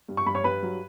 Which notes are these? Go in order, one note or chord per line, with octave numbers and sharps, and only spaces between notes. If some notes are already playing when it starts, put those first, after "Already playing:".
G2
C#6
G2 B5
C#5 C#6
G2 B4 B5
F#3